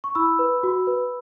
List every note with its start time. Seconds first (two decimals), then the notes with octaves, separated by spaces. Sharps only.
0.04 C#6
0.15 E4 B5 E6
0.39 B4
0.63 F#4
0.87 B4